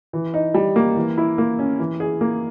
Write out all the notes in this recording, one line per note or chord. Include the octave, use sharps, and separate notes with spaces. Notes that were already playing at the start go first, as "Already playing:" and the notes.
E3
D#4
G3
A#3
E3
E4
A#3
C#4
E3
G#4
A#3